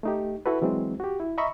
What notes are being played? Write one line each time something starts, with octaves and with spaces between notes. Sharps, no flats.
A3 D#4 G4
E4 F#4 A4 B4
E3 F#3 G#3 C4
F#4 G4
E4
D#5 E5 A#5 B5 C#6